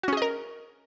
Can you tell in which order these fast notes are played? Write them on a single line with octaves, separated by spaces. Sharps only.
F#4 C#4 G#4 D#5 A#4